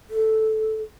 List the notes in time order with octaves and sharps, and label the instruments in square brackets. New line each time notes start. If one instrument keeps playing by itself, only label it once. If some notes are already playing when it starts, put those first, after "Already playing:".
[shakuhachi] A4